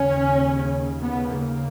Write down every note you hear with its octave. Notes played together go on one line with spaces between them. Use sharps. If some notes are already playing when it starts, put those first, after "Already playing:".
Already playing: D#2 C#3 C#4
B3
A#3